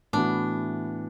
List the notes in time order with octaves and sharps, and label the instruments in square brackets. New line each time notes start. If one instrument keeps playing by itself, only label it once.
[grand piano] A2 E3 B3 F#4 [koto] D4